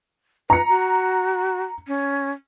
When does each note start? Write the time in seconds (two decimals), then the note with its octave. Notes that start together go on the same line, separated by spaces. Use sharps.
0.50 B4 A#5 C#7
0.69 F#4
1.88 C#4